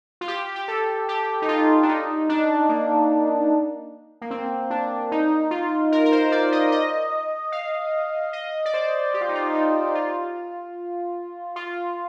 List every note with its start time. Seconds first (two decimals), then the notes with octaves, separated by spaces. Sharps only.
0.21 F4
0.28 G4
0.56 G4
0.68 A4
1.09 G4
1.42 D#4
1.48 F4
1.83 D4
1.89 D#4
2.29 D4
2.69 A#3
4.22 A#3
4.31 C4
4.70 D4
5.12 D#4
5.51 F4
5.92 A#4
6.06 A#4
6.12 C5
6.32 D5
6.52 D#5
6.72 D#5
7.52 F5
8.33 D#5
8.66 D5
8.74 C5
9.14 G4
9.21 F4
9.29 D#4
9.35 F4
9.54 D#4
9.95 F4
11.56 F4